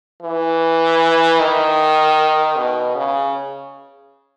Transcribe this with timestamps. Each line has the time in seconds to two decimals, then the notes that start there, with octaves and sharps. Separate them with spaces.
0.22 E3
1.40 D#3
2.56 B2
2.95 C#3